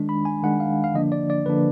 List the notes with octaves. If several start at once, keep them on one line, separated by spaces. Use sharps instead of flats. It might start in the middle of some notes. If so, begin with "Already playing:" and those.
Already playing: D#3 G#3 D4
B5
G#5
D#3 G#3 D4 F#5
F5
F5
D3 F3 A#3 D4 D#5
D5
D5
D3 F3 A#3 D4 B4